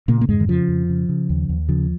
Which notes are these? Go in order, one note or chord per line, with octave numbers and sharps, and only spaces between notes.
A#2 C#3 A#3
A#3
F2 G#2 G#3
D#3
C#3 F3
F2
C#3
C#3
D#2
D#2
C#3 F3